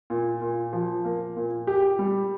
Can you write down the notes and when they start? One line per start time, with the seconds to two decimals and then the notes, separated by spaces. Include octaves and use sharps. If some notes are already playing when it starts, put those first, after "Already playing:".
0.10 A#2
0.42 A#2
0.73 F3
1.05 A#3
1.37 A#2
1.67 G4
1.99 G3